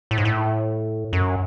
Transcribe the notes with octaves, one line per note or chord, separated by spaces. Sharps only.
A2
G#2
A2
F#2